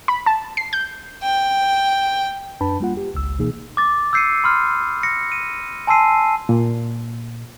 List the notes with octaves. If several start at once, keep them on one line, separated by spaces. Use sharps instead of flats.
B5
A5
C7
G6
G5
F#2 D4 B4 A5 B5
G3 A#3 F4 F#5
G4
G#1 C#2 E6
B2 E3 A#3 D#4 G#4
D6 A6
E6 G6 C7 C#7 D#7
B5 C6 F6
A#6 C#7
D#7
G#5 A5 C6 E6 C7 D#7
A#2